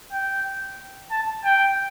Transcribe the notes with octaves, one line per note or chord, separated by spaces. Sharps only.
G5
A5
G5